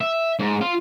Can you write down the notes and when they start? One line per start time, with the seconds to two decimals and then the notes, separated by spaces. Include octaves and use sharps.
0.01 E5
0.39 G#2
0.61 F4